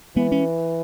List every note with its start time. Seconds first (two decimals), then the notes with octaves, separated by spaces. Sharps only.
0.16 E3 G#3 B3
0.32 C#4